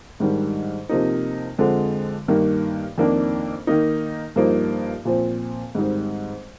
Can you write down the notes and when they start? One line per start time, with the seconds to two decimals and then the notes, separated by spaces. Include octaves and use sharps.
0.20 G#2 D#3 G3 D4
0.89 C3 F3 A#3 D#4
1.58 F2 D3 F3 G#3
2.28 G2 D#3 A#3
2.98 F2 D#3 A#3 D4
3.67 D#3 A#3 D#4
4.36 G2 F3 A#3 D#4
5.05 A#2 F3 C4
5.75 G#2 D#3 G3 C4 D#4